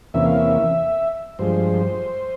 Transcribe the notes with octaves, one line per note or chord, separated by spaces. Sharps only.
E2 C3 E3 A#3 C#4 E5
F5
E5
G2 F3 G#3 C5